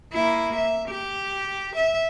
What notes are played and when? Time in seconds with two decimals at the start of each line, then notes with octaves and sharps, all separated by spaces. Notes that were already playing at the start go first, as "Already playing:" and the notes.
0.13 A#3 E4
0.56 E5
0.89 G4
1.76 E5